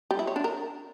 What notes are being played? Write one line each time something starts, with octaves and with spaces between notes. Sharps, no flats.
G3
E4
C#5
D4
A#4